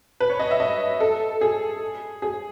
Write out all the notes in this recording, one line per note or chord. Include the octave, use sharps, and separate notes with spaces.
B4
C#5
D#5
E5
D#5
A4
G#4
G#4